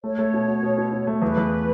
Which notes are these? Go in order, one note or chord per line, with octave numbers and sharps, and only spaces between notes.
A3 C#5
A3
B2
F#4
B2
B2
B2
A3
E2 B4
E2